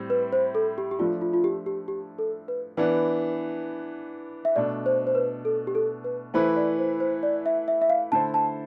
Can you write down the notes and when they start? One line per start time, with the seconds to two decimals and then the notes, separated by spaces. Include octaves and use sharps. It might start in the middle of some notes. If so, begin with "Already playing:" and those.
Already playing: A2 G3 C4
0.10 B4
0.33 C5
0.55 A4
0.78 G4
0.91 G4
0.99 F3 A3 D4 F4
1.21 F4
1.33 F4
1.44 G4
1.66 G4
1.88 G4
2.19 A4
2.48 B4
2.77 E3 B3 D4 B4
4.45 E5
4.56 B2 A3 D4 D5
4.86 C5
5.07 C5
5.15 B4
5.45 A4
5.67 G4
5.75 A4
6.04 B4
6.34 E3 A3 E4 B4 C5
6.56 D5
6.79 C5
7.00 C5
7.23 D5
7.46 E5
7.68 E5
7.82 E5
7.90 F5
8.12 D3 A3 E4 A4 C5 A5
8.34 A5